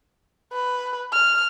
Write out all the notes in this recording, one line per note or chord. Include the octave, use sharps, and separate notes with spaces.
B4
F6